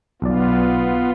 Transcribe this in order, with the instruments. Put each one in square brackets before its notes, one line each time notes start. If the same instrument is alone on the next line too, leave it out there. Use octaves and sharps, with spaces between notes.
[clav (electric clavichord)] B1 D5 [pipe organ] B3 F4